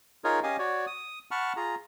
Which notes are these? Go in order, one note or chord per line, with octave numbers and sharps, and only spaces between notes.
D#4 F4 G#4 A#4 C#5
C#4 G4 D#5 F5 G#5
F#4 C#5 D5
D#6
F#5 A5 B5 C#6 F6
F4 G#4 A#5